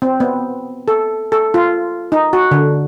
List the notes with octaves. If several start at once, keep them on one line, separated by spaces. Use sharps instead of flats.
C4
B3
A4
A4
F4
D#4
F#4
D3